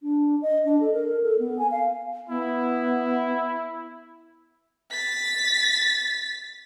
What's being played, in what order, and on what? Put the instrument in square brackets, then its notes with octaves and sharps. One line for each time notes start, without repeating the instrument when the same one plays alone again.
[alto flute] D4
D#5
D4
A4
A#4
A4
B3
G#5
F5
[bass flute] B3 [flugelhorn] E4
[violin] A6 B6